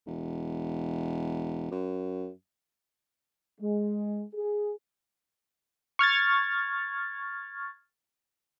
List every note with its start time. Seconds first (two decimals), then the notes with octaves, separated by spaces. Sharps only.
0.06 E1
1.71 F#2
3.60 G#3
4.34 G#4
5.99 C#6 F6 G#6 A6